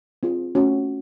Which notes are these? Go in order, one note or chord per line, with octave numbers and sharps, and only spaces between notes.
C4 F4 G#4
A3 C#4 F#4